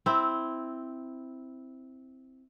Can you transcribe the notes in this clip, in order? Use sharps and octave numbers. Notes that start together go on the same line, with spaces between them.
C4 E4